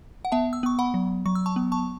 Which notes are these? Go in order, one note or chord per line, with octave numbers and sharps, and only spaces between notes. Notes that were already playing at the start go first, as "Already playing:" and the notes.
F#5
B3 E5 A5
E6
B3 C#6
F#5 B5
F#3
F#3 C#6
E6
A5 C#6
B3
A5 C#6